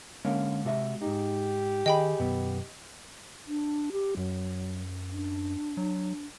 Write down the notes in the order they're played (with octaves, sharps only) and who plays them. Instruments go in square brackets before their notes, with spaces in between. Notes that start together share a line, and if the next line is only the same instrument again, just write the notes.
[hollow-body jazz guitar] D3 A#3 C#4 [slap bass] G#3
[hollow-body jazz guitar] C3 F#4 E5
[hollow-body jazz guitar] G#2 D#4 [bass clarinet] G4
[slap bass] D#3 [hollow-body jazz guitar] G#4 [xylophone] D#5 G5 B5
[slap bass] F#2 B2 [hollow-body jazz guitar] B3
[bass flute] D4
G4
[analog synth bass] F#2 [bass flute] F#3
[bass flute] D4
[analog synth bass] F#3